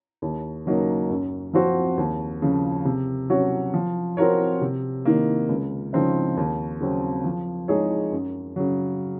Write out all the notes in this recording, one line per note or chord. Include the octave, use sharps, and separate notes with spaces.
D#2
C#3 F#3 A#3 D#4
F#2
F3 C4 F#4 C5
D#2
C#3 F3
C3
F#3 C#4 F#4 C#5
F3
C4 F#4 A#4 C#5
C3
D#3 A#3
C#2
C#3 F3 C4 D#4
D#2
C#3 F#3 C4
F3
G#3 D#4 G#4 C#5
F#2
C#3 F#3